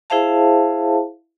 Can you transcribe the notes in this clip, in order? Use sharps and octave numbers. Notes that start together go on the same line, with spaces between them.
E4 G#4 C5 E5 F5 A5